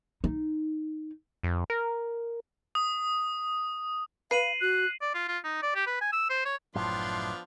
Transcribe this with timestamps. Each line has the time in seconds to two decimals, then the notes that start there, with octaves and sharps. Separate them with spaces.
0.24 D#4
1.43 F2
1.70 A#4
2.75 D#6
4.31 B4 F5 C7 D#7 F#7
4.61 F#4 F#6
5.01 D5
5.14 F4
5.28 F4
5.44 D#4
5.62 D5
5.75 G4
5.87 B4
6.01 G#5
6.12 E6
6.30 C5
6.45 C#5
6.75 F#1 A2 F3 F#3 B3 D4 C6